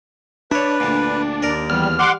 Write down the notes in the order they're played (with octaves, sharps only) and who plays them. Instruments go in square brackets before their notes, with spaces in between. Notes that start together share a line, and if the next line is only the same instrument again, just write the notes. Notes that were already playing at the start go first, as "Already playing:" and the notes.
[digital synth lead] D4 [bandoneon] B4 [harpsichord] C#5 E5
[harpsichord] D2 A#2
[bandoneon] D#2 [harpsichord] A#4 D5
[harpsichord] E2 [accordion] G3 [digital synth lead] F6
[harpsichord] G3 [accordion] F#5 C6 D6